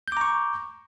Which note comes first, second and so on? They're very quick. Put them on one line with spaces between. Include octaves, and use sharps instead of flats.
G6 D6 A#5 C#6